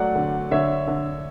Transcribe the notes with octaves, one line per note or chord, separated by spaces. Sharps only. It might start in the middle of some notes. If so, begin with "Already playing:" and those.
Already playing: F#3 A3 D5 F#5
D3
D3 C#5 E5
D3